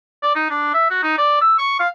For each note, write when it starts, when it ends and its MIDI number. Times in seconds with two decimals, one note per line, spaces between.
0.23 0.35 74
0.35 0.48 63
0.50 0.70 62
0.74 0.90 76
0.90 0.99 66
1.03 1.14 63
1.18 1.39 74
1.41 1.54 88
1.59 1.75 85
1.80 1.88 77